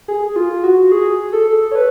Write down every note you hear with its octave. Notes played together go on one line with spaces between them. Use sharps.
G#4
F4
F#4
G#4
A4
C#5
B4